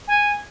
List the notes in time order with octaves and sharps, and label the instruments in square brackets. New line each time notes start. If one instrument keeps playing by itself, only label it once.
[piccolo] G#5